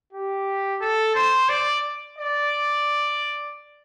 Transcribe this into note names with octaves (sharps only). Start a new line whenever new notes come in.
G4
A4
C5
D5
D5